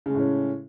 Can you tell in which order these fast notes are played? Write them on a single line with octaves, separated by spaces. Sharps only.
C#3 G#3 A2 C#4